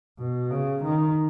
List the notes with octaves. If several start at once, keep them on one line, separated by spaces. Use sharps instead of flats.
B2
C#3
D#3